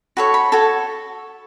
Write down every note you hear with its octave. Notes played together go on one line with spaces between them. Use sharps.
F#4 A4 C#5 B5
B5
F#4 A4 C#5 A5